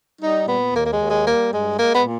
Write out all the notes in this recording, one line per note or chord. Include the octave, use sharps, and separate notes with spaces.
G3 D#4
A#2 B3
D#2 A#3
A#3
G#3
D#2
G#3
G3 A#3
G2 G#3
G#3 A#3
B3
A#2